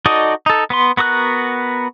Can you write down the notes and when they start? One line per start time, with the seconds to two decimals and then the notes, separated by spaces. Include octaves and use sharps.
0.06 D#4 F#4 A4 D5 D#5
0.46 D#4 A4
0.70 B3 B4 C6
0.97 B3 F#4 A#4 D#6 F#6